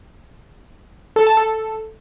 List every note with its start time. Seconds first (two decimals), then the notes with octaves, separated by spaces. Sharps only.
1.16 A4
1.27 A5
1.37 A4